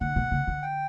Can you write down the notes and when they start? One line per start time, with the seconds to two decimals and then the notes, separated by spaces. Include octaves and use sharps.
0.01 D3 F#5
0.16 B2
0.31 C#3
0.47 D3
0.62 G5